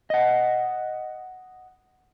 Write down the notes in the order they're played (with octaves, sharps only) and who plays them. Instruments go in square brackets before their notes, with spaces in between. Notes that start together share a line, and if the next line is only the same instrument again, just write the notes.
[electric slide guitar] D#5 F#5